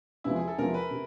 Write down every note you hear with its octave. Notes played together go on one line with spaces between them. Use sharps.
E2 C3 F3 G#3 E4
G#4
A4
E2 C3 F3 G#3 A#4
B4
C3